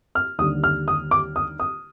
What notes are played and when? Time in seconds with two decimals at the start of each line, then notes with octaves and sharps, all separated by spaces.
0.15 F6
0.38 D#2 D3 G3 D#6
0.64 F6
0.88 D#6
1.11 D6
1.36 D#6
1.60 D#6